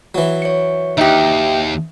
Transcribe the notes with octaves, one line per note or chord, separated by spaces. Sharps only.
E3 F#3
C#5 C#7
D#2 D#4 G4 E5 D#6